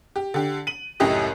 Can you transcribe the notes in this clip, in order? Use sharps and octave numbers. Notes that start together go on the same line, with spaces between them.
G4
D3 G4
D#7 F#7
C#2 F#2 A2 G4 D#5